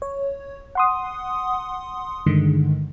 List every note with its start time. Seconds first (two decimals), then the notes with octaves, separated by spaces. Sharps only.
0.02 C#5
0.75 F#5 C6 D#6
2.26 G2 D3 D#3 G#3